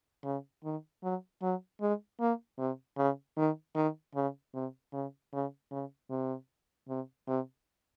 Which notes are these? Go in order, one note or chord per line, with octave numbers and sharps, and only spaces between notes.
C#3
D#3
F#3
F#3
G#3
A#3
C3
C#3
D#3
D#3
C#3
C3
C#3
C#3
C#3
C3
C3
C3